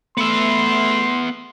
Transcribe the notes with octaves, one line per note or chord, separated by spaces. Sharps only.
A3 B3 E5 C6